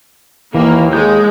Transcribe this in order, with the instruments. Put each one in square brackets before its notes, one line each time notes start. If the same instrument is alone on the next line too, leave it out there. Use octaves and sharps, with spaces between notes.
[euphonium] D#2 [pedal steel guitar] E3 [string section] A#3
[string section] G#3 [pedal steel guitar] G6